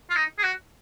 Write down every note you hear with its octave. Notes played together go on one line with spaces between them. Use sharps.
F4
D#4
G#4
F#4